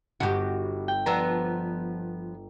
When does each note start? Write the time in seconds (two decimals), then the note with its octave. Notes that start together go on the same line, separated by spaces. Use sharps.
0.20 G1 B3 F#4 G4
0.88 G5
1.06 F3 B3 D4 A#5 E6